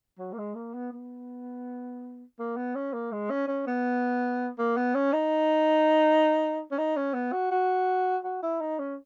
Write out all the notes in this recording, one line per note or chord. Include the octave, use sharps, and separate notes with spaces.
F#3
A#3
G#3
A#3
B3
B3
A#3
B3
C#4
A#3
G#3
C#4
C#4
B3
A#3
B3
C#4
D#4
C#4
D#4
C#4
B3
F#4
F#4
F#4
E4
D#4
C#4